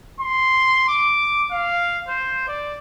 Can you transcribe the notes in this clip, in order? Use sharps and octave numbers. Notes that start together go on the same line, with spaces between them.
C6
D6
F5
C5
D5